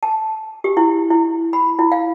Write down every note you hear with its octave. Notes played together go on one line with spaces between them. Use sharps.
A5
G4
E4
E4
B5
E4
F5